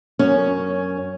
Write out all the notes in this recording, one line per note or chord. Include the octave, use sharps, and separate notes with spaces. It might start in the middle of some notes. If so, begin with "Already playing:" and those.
F#2 C#4